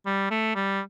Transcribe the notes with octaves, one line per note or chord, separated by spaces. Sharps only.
G3
A3
G3